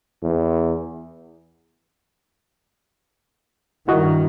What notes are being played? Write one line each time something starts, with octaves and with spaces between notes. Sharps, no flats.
E2
G2 D#3 E4 F#4 D#5